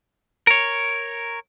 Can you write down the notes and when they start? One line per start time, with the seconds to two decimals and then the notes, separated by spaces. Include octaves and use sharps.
0.47 A#4 C#5